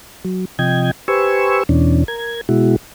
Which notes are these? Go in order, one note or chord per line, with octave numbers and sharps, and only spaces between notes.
F#3
C3 F3 D#5 G5 G#6
G4 B4 C5 G#5 C#6 E6
E2 B2 E3 C#4 D4
A#4 G#6
B2 G#3 E4 F#4